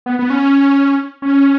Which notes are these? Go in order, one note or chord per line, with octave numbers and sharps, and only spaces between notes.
B3
B3
C#4
C#4